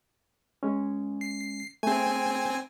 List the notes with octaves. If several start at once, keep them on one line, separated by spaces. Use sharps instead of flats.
G#3 C#4
C7
A3 C4 G#4 G#5